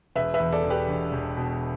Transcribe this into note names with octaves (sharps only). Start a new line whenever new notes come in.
E1 B4 E5
B4 E5
E2
A4 D5
E1
G4 B4
E1
E1
B2